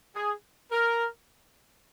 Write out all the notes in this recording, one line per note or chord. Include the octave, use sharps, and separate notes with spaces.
G#4
A#4